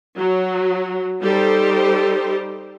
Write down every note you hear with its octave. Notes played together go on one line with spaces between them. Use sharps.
F#3
G3 D#4 G4 A4 C5